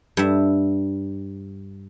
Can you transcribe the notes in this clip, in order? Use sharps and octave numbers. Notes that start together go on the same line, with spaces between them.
G2 E5